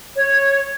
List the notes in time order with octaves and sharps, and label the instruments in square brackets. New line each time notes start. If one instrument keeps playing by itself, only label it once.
[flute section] C#5